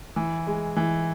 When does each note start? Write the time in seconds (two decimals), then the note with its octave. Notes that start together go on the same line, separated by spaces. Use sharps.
0.16 E3
0.47 G#3
0.76 E3